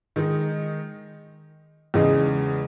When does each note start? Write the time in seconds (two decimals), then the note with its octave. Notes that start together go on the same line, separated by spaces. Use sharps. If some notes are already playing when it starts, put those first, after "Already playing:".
0.16 D#3 G#3 D#4
1.94 E2 C#3 G#3 D#4 G#4